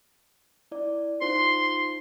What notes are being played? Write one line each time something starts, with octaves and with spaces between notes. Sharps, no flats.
E4 D5
D#4 F4 C5 C6